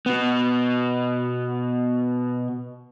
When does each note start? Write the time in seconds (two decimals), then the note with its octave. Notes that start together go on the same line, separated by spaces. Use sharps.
0.06 B2 B3